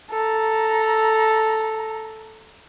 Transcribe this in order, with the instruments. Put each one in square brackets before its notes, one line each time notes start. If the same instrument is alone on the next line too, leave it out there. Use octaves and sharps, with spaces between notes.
[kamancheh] A4 A#5